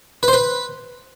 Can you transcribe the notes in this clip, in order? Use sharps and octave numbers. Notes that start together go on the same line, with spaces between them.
B4
C5
B4